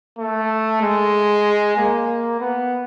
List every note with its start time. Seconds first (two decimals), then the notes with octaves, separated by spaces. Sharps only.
0.19 A3
0.82 G#3
1.77 A#3
2.40 B3